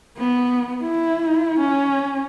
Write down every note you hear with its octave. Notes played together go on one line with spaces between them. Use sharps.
B3
E4
C#4